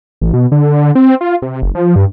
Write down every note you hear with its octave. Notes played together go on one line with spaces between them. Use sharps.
A1
B2
D3
C4
F4
C3
F#1
F3
G2